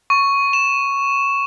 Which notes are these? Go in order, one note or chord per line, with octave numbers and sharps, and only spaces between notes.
C#6
E7